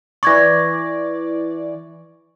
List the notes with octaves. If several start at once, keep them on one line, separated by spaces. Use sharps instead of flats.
E3 D5 C#6 G#6 A#6